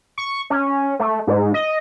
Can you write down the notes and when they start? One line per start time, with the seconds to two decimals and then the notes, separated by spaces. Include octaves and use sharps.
0.18 C#6
0.50 C#4
0.99 A3
1.27 G#2
1.54 D#5